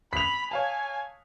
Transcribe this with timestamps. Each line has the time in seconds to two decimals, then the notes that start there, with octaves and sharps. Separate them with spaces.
0.13 B5 B6 F7
0.51 C#5 F5 G#5 A5